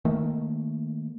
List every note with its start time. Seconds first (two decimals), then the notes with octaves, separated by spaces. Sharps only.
0.05 D#3 A3 A#3